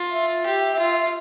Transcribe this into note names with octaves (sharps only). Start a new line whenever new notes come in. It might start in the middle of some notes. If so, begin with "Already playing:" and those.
Already playing: F4
E5
G4
F4